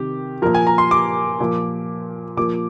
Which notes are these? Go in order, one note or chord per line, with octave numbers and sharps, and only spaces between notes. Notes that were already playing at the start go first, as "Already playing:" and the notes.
Already playing: C3 D#3 G4
A#2 F3 A#4
G#5
A#5
C6
D6
A#2 F3
A#2 F3 D6